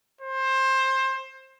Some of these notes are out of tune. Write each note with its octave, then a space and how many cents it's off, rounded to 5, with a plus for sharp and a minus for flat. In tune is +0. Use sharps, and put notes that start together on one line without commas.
C5 +20